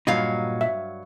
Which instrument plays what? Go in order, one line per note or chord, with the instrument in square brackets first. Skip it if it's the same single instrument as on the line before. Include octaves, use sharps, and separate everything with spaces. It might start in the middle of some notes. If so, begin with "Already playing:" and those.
[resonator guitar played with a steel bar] G2 F#3 F5 [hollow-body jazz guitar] A#2 G3 D#4
[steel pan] E5